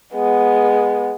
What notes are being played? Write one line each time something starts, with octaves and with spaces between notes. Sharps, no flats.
G#3 B3